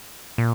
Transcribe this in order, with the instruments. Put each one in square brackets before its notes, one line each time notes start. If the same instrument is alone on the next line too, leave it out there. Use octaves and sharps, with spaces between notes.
[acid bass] A#2